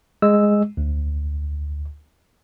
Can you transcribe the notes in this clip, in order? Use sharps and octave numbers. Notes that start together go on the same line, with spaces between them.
G#3 E6
D2